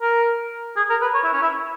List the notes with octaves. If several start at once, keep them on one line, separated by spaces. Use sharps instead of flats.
A#4
G#4
A#4
B4
C#5
E4
C#4
E4